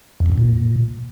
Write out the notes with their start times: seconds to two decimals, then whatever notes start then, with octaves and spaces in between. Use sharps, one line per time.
0.20 F2
0.26 E2
0.32 F#2
0.38 A#2